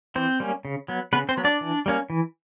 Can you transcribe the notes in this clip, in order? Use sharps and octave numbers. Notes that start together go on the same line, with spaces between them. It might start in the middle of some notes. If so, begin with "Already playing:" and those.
E3 C4 C5
G3 A#3 C#4
C#3
F#3 B3
C#3 B3 B4
C4 C5
F#3 B3
D4 D5
E3
G3 A#3 C#4
E3